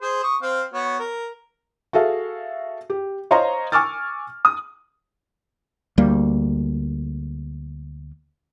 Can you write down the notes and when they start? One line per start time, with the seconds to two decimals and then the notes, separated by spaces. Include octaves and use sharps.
0.02 G#4 C5
0.24 C#6 D#6
0.42 C4 F5
0.74 B3 F#4 C#5
0.99 A#4
1.93 F#4 G#4 A4 E5 F5
2.90 G4
3.31 C5 C#5 D#5 F5 A#5 C6
3.72 G#5 C#6 D6 E6 F6 A6
4.45 D#6
5.98 D2 G3 A#3